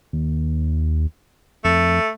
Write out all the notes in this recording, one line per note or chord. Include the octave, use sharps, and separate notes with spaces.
D#2
F2 A3